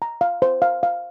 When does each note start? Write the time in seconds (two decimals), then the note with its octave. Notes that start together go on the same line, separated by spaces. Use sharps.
0.02 A#5
0.21 F5
0.42 C5
0.62 F5
0.83 F5